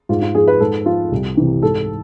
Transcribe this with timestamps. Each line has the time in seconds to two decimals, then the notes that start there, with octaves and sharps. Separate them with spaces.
0.09 G#2 F4
0.22 F4
0.35 F3 G#4
0.48 B4
0.60 G#2 A4
0.86 F3 F4
1.12 C2
1.37 C3 E3
1.62 G#2 A4